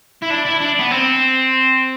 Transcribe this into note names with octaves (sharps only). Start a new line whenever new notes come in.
E4
D4
E4
D4
B3
C4